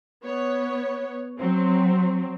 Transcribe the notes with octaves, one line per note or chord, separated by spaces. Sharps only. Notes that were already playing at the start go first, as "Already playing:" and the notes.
B3 C#5
F#3 C4